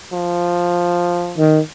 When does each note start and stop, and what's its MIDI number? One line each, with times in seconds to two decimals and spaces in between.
0.12 1.40 53
1.38 1.60 51